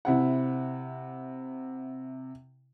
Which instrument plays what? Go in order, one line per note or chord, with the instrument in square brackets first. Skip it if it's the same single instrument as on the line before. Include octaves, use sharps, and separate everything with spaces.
[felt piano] C3 E4 F#5